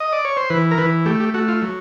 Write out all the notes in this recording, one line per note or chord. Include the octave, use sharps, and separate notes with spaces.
D#5
D5
C#5
C5
E3 B4
A#4
E3 B4
A3 G4
G4
A3 F#4
F4
F#3